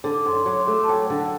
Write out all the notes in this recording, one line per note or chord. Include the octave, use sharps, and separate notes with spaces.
D3 D6
D6
F#2 C6
C6
F#3 D6
C6
A3 D6
D6
A5
F#3 G5
F#5
D3
F#5